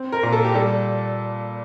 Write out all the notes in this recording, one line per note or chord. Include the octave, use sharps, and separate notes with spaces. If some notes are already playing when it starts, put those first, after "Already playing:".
Already playing: C4
A#4
A#2
A4
G4
G3 A4